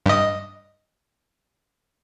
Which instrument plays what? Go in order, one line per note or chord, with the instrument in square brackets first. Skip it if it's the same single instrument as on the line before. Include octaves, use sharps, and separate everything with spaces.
[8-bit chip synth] G2 D#5